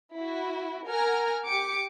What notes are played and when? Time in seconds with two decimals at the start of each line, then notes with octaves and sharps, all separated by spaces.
0.16 E4 F#4
0.87 A#4 F#5 G#5 A#5 F6
1.45 G4 D6 C#7